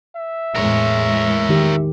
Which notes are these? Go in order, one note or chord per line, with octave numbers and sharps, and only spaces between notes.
E5
E2 A2 G#3 A#4 C#5
D#3 G4